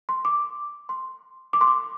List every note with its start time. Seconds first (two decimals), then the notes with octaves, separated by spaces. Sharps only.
0.09 C6
0.25 D6
0.89 C6
1.53 D6
1.61 C6
1.68 D6